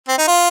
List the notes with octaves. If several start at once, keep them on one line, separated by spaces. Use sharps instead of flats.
C4
D#4
F4